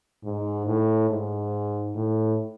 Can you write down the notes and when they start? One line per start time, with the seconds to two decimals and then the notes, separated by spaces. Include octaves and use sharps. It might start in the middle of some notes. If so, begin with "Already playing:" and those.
0.23 G#2
0.66 A2
1.09 G#2
1.95 A2